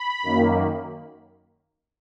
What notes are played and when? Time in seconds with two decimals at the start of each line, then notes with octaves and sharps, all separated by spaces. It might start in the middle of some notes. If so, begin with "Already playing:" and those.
Already playing: B5
0.23 F#2 D#3 A#3